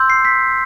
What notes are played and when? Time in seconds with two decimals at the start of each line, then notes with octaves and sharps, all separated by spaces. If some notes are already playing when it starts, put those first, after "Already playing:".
Already playing: C6 E6 G6
0.10 C7
0.25 B6